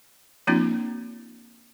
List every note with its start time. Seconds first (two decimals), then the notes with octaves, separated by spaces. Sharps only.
0.47 F3 A#3 C4 D4 E4 F#4